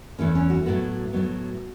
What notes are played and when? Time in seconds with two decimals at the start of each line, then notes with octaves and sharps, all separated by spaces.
0.19 E2 E3 A3 C#4
0.35 C#4
0.50 F#4
0.66 A2 F#3 B3 F#4
1.13 A2 F#3 B3